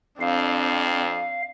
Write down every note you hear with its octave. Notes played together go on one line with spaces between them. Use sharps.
F2 C4 D4 F5